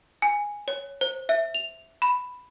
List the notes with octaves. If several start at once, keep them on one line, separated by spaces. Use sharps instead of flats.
G#5
C#5
C5
E5
F7
B5